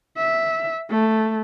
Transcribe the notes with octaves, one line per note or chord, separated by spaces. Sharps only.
E5
A3